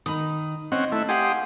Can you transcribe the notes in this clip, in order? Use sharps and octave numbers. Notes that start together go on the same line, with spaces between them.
D#3 D#4 B5 D#6
C4 C#4 D#5 F#5
A3 E4
G4 F5 F#5 G#5 C6 D#6